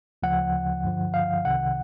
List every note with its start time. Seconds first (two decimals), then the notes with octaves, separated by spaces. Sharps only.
0.23 D2 C#3 F3 F#5
0.84 G2 D3 F3
1.14 F5
1.45 C2 C3 D#3 F#5